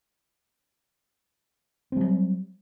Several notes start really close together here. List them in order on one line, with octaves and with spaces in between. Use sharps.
C4 G3 F#3